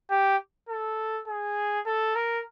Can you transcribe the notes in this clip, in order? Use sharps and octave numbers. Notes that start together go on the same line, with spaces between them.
G4
A4
G#4
A4
A#4